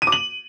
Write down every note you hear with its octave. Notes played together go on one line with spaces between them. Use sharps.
D#7
D6
F#7